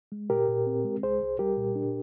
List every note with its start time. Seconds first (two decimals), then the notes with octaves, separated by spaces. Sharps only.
0.12 G#3
0.30 A#2 G4 A#4
0.48 A#2
0.67 C4
0.84 G#3
1.03 C2 G#4 C5
1.21 C2
1.39 G3 G4 A#4
1.57 A#2
1.75 D4